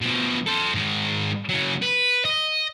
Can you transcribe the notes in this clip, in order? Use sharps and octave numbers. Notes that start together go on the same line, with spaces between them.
B2 F3
A4 C5
G#2 D#3
C#3 F#3
B4
D#5